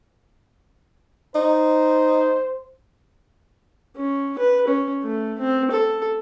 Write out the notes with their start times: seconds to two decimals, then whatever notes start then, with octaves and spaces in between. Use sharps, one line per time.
1.35 D#4 C5
3.96 C#4
4.38 B4
4.67 C#4
5.03 A3
5.39 C4
5.71 A4